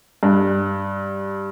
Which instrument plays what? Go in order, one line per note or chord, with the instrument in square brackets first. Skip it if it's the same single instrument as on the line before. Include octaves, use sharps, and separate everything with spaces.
[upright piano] G2